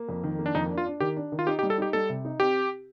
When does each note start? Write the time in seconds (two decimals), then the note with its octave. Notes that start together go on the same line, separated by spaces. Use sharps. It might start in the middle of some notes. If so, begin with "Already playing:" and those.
Already playing: A#3
0.09 F2
0.23 D#3
0.39 A#3
0.46 D4
0.55 F2 D#4
0.71 D4
0.78 F4
0.86 D4
1.00 D#3 G4
1.17 D4
1.32 D#3
1.39 F4
1.47 D#4 G4
1.59 G4
1.63 G3
1.70 A4
1.78 D#4 G4
1.93 G3 A4
2.09 C3
2.25 D#4
2.40 C4 G4